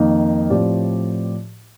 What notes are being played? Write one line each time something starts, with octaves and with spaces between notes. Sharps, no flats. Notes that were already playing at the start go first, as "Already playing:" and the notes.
Already playing: F2 D#3 A#3 D#4
A2 F3 C4 G4 D5